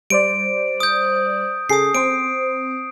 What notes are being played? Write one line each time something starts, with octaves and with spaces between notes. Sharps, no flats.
G3 C5 D5 D7
D#6 G6
C#3 G#4 A4 D#6 C7
C4 C5 D7